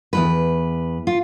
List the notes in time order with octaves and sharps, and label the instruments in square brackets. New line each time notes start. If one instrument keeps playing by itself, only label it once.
[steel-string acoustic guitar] E2 G#2 B4
F4